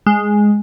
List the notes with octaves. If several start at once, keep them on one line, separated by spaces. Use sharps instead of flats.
G#3